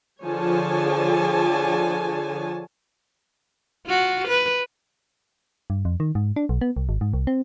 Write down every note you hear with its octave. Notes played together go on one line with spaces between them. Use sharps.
D3 F3 G#4 C#5 G#5 A5
F4 F#4
B4
G2
F2
D#3
G#2
D4
B1
B3
C2
G#1
G#2
C2
C4